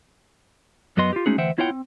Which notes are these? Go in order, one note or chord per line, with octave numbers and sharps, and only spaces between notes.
F#2 F#3 B3 D#5 C6
F4 G4
G#3 A3 C#4 D#4 F#4 G#4
D2 E3 C5 E5 F#5 G5
B3 E4 F4 C#5 F#5 G5
C4